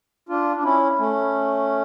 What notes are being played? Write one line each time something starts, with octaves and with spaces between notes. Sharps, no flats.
D4 F4
D4
C#4 E4
A3 C#4